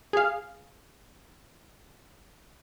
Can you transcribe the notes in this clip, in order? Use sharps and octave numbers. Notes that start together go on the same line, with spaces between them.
G#4 F5